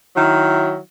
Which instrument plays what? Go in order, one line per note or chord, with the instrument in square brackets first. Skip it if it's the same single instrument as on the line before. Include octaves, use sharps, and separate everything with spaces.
[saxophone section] D#3 F#3 E4